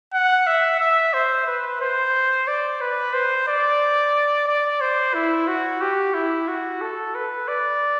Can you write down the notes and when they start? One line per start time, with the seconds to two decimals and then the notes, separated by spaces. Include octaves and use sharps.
0.14 F#5
0.47 E5
0.80 E5
1.14 C5
1.47 B4
1.81 C5
2.48 D5
2.81 B4
3.14 C5
3.48 D5
4.48 D5
4.81 C5
5.14 E4
5.48 F#4
5.81 G4
6.14 E4
6.48 F#4
6.81 A4
7.15 B4
7.48 D5